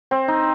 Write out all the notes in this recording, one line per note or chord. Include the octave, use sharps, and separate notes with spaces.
C4
D#4